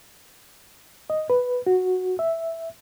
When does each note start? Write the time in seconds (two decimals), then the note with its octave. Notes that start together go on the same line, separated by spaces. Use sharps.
1.10 D#5
1.30 B4
1.67 F#4
2.19 E5